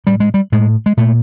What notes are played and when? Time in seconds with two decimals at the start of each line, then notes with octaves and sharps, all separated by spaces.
0.07 A2 G3
0.20 G#3
0.34 G3
0.52 A2 G#3
0.86 G#3
0.97 A#2 A3